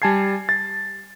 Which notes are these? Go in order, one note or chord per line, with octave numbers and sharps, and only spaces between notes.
G3 G#5 A5 G#6 C7
A6